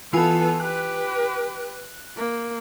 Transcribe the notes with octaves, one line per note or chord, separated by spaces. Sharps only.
E3 B3 F4 A4 G#5
G4 B4 F#6
A#3